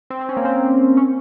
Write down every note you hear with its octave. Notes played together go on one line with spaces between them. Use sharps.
C4
C4
C#4
A#3
C4
C#4